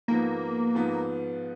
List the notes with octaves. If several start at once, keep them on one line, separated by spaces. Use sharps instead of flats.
G#2 F3 A#3 B3
G#2 F3 B3